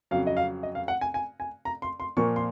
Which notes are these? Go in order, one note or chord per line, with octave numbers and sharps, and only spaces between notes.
F2 C#3 F#3 F5
D#5
F5
D#5
F5
F#5
G#5
G#5
G#5
A#5
C6
C6
A#2 F3 A#3 C#6
C6